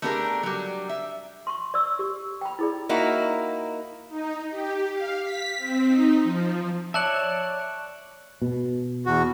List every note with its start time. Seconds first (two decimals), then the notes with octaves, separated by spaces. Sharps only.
0.02 A3 B3 D4 G4 G#4 A#4
0.43 F#3 G3
0.89 E5
1.47 C6 C#6
1.74 D5 E6
1.99 G4
2.41 G5 B5
2.59 E4 G#4 D5
2.89 A#3 D#4 E4 F#4
4.09 D#4
4.50 G4
4.93 F5
5.22 B6
5.57 C4
5.87 D#4
6.23 F3
6.94 C#5 D5 E5 A5 F#6 F#7
8.42 B2
9.06 E2 F#4